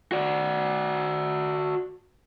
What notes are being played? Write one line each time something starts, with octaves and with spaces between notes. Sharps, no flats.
F#4 D5